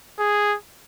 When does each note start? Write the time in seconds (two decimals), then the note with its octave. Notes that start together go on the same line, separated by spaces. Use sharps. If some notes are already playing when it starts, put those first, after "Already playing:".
0.19 G#4